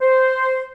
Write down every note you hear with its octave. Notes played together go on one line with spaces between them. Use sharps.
C5